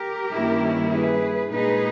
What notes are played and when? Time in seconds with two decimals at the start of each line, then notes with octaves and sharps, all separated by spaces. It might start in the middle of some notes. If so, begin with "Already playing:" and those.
Already playing: G4 A#4
0.34 G2 D#3 A#3 C#4 E4
0.92 G#4 B4
1.51 A#2 G#3 D#4 G#4 B4